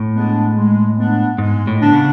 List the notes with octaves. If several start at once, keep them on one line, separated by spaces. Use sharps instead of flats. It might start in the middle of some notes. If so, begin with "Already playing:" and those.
Already playing: A2
G#3 B3 D4 G#4
G#3
B3 D4
G#2 G#3
A2
D3 B3 D4
C#3